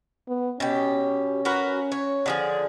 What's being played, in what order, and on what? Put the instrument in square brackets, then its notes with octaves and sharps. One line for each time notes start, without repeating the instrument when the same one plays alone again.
[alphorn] B3
[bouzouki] B2 G4 [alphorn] C#4
[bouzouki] F#4 A#4 B4
C#5
D3 F3 G#4